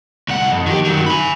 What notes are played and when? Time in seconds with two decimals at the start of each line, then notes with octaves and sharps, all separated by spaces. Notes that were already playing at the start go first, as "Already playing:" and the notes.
0.28 C2 F#5
0.51 F2
0.66 D#3 G4
0.85 D#3 F#3
1.06 G#5 B5